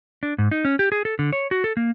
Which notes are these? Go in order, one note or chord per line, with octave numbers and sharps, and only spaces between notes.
D4
G#2
D#4
C#4
G4
G#4
A4
D3
C#5
F#4
A4
A#3